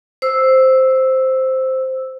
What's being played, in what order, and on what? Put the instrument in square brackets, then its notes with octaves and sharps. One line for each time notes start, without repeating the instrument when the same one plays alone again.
[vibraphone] C5 E6